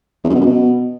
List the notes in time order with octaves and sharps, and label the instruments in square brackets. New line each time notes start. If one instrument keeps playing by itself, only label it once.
[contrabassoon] E2
F#2
B2
F#2
B2